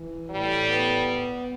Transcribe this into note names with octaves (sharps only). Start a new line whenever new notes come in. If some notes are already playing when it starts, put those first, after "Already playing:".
Already playing: E3
A2 G3
B3